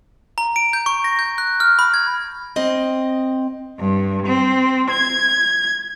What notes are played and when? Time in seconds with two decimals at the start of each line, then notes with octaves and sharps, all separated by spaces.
0.38 A#5
0.56 D7
0.73 G6
0.86 C#6
1.04 A#6
1.19 G6
1.38 F#6
1.60 F6
1.79 B5
1.94 G#6
2.56 C4 D#5
3.79 G2
4.27 C4
4.90 G#6